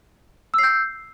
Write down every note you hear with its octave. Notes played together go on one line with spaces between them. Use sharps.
E6 G6 C7